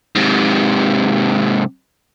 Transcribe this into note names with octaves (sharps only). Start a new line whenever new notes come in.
G#2 C3